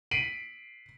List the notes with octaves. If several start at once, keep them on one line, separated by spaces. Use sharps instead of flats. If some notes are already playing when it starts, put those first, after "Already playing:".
B6 C7 D7 D#7 F#7